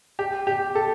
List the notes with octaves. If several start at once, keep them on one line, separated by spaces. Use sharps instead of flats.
G4
G4
A4